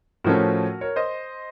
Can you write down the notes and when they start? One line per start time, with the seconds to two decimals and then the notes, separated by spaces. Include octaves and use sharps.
0.24 A2 F3 A3 C#4 F#4 A#4
0.81 A#4 C#5
0.96 C5 D#5